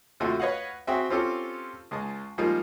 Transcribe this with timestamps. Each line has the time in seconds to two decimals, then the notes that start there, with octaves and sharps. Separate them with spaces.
0.20 D#2 C3 A3 F4 F#4
0.40 B4 C#5 D#5 F5 F#5
0.87 C4 F#4 G#4 E5 G5
1.10 C4 C#4 F4 G4 A4
1.91 C#2 G#3 A5
2.38 F3 G3 G#3 A#3 D#4 F4